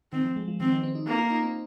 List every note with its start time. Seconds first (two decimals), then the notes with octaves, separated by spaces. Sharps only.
0.12 D#3 C4
0.24 F3
0.36 G#3
0.48 F3
0.60 D#3 C4
0.72 D#3
0.83 C4
0.95 D#4
1.07 A#3 D#4
1.18 F4
1.31 D#4
1.43 C4